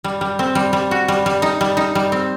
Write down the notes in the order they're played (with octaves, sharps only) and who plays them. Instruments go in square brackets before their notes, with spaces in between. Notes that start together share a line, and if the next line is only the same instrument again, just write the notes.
[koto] G3
G3
C4
G3
G3
F#4
G3
G3
D#4
G3
D#4
G3
C4